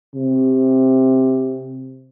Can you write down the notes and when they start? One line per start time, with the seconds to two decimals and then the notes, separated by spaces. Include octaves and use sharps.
0.15 C3